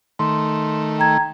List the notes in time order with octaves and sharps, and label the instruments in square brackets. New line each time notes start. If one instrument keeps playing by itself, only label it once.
[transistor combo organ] D#3 A3 [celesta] C6
[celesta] G5 A#5 G#6